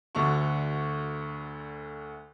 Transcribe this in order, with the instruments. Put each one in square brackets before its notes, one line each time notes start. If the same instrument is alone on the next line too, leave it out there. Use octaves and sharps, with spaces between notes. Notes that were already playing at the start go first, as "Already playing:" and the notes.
[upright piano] D2 D3 D4 F#4 C#6